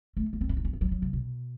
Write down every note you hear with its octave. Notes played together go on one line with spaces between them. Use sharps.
A3
A#3
C4
C#4
D#4
C#4
B3
F#3
F#3
C#3
B2